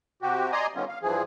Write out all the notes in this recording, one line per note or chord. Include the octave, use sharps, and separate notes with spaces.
C3 F#4 G4
D5 D#5 G#5 A#5 C6 D#6
D3 D#3 G3 B3 C#4 F4
F5
G2 E3 F3 G#4